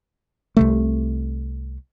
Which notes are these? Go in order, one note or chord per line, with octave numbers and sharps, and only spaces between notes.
C2 C3 A3